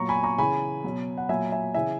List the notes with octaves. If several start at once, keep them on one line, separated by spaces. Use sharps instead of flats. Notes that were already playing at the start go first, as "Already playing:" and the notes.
Already playing: A#2 F#3 A#5 C#6
G#5 B5
A#5 C#6
C#3 E3 G#5 B5
B2 F#3
F#5
A#2 F#3 E5 G#5
E5 G#5
C#3 E3 E5 G#5